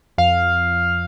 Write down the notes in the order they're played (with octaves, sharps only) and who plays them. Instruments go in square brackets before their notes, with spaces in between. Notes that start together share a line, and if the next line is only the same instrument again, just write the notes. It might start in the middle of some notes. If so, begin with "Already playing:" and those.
[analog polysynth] F2 F5